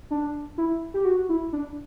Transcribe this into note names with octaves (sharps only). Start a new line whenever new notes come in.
D4
E4
G4
F#4
E4
D4